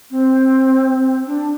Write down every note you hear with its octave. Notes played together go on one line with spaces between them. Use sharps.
C4
D4